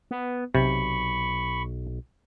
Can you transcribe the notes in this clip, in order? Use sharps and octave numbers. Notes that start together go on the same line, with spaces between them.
B3
B1 C3 B5 C#6